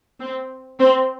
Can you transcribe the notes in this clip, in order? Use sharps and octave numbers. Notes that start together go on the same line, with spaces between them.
C4
C4